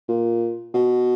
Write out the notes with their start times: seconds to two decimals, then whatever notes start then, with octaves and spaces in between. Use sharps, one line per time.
0.09 A#2
0.74 B2